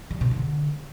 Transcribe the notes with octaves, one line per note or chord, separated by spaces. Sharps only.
G3
C3
D3